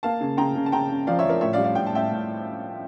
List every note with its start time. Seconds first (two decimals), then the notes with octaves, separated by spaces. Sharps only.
0.03 A#3 F5 A5
0.21 C#3
0.37 C#3 G5 A#5
0.56 C#3
0.66 A5
0.72 C#3 G5 A#5
0.90 C#3
1.07 F3 D5 F5
1.19 C#5 E5
1.25 F3 A#4 D5
1.41 A2 C#5 E5
1.53 D5 F5
1.58 G3
1.64 D5 F5
1.75 A2 G5
1.86 A5
1.93 A2 E5 G5
2.10 A2